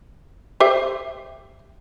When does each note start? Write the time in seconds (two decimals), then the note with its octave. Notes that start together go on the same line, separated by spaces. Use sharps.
0.60 G4 C5 E5